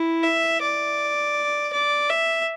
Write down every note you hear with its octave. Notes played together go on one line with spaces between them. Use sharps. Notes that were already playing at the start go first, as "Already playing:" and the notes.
Already playing: E4
E5
D5
D5
E5